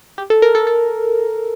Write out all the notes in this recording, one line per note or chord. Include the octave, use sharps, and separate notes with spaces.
G4
A4
A#4
A4
A4